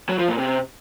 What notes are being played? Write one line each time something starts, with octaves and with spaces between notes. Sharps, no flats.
F#3
F3
A#2
C3